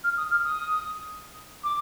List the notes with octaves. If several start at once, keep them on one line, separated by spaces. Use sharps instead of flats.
F6
D#6
F6
D#6
D6